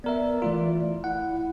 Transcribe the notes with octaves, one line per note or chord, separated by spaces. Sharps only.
B3 A#4 D5 E5
E3 A3 F4
E4 F#5